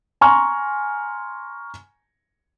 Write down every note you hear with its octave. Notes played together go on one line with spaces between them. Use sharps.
G#5 A#5 C6 C#6 F6